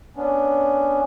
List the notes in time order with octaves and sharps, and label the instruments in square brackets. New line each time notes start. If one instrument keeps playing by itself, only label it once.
[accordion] B3 C#4 D4